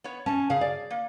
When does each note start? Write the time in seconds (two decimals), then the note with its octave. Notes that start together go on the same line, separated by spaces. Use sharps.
0.04 B3 C#5
0.26 B2 C#4 A5
0.50 C#3 G#4 F5
0.61 D5
0.91 A#3